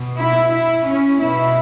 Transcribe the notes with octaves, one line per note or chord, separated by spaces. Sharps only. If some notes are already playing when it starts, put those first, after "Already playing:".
Already playing: B2
E4
E4
C#4
B2 E4